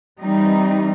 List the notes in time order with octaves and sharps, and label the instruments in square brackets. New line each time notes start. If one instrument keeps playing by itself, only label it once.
[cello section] E3 G3 C4 D#4